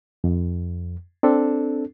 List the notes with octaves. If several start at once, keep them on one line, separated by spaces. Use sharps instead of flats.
F2
C4 D4 A4